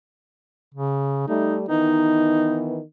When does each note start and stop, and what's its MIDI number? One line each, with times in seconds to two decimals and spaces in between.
0.74 1.26 49
1.28 1.63 55
1.28 1.63 57
1.28 1.55 63
1.69 2.79 51
1.69 2.79 52
1.69 2.79 59
1.69 2.61 63